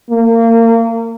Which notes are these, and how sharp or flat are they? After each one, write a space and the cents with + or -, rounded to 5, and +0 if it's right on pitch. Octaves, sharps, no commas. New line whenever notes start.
A#3 -30